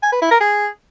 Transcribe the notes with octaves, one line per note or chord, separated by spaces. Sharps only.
G#5
B4
E4
A#4
G#4